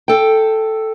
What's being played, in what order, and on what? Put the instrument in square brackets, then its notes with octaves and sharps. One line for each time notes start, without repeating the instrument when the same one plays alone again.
[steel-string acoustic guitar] A4 G5